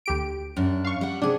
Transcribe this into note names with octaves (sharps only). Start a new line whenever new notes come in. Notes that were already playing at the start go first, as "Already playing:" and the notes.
D2 G4 D7
F#2 D4
F5 C#6
G3 F#5
C3 D4 G#4